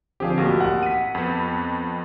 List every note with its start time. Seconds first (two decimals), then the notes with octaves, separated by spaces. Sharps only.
0.20 D3 F3 C4 G4 G#4 F5
0.38 A1 A#3 F#4 G4
0.60 F#5
0.83 B6 D#7
1.15 F2 B3